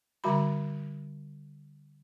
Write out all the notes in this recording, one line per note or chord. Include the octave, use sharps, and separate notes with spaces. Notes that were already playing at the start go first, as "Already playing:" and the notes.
D3 G3 F#4 B5